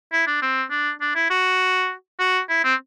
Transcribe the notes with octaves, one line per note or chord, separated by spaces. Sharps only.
E4
D4
C4
D4
D4
E4
F#4
F#4
E4
C4